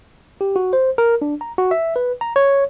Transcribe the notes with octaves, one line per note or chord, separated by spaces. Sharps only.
G4
F#4
C5
A#4
D4
A#5
F#4
E5
B4
A#5
C#5